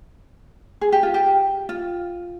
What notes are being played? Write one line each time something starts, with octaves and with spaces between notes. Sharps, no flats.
G#4
G4
F4
G4
F4